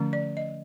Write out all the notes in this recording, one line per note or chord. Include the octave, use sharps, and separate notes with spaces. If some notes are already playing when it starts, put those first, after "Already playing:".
Already playing: D3 F3 A3 C#4
D5
D#5